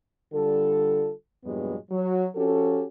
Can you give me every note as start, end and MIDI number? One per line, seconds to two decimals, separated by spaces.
0.33 1.11 50
0.33 1.11 55
0.33 1.11 65
0.33 1.11 69
1.45 1.76 40
1.45 1.76 43
1.45 1.76 46
1.45 1.76 54
1.45 1.76 56
1.45 1.76 59
1.91 2.27 54
2.36 2.84 53
2.36 2.84 61
2.36 2.84 66
2.36 2.84 67
2.36 2.84 69